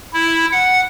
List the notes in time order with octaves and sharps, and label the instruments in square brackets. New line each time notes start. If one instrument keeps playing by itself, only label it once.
[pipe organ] E4
F#5